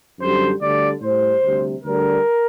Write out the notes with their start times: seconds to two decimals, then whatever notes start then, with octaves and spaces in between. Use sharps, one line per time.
0.19 F#2 D3 G3 C5
0.60 D2 D3 G3 D5
1.01 A2 G3 C5
1.42 D2 C3 G3
1.83 D2 D3 G3 A#4